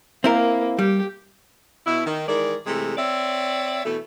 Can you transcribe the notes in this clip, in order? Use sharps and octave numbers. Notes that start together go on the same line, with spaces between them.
A#3 C4 E4 A#4
G3 G4
B2 E4
D#3
D#3 E3 G#3 A#4 D5
C3 E3 G#3 A3
C4 C#5 D5 E5
B2 E3 A3